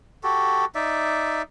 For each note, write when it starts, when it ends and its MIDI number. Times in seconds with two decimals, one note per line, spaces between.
0.23 0.65 66
0.23 0.65 67
0.23 0.65 69
0.75 1.42 63
0.75 1.42 74
0.75 1.42 76